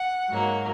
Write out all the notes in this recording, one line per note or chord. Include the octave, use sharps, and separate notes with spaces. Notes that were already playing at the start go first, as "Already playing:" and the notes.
Already playing: F#5
G#2 F#3 A#3